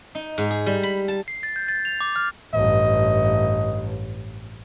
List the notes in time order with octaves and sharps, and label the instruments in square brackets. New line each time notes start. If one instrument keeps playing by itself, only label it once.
[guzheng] D#4
G#2
G#4
G3
B5
A5
[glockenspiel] C7
A6
G6
A6
F7
D6
F6
[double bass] A1 G2 [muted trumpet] D#5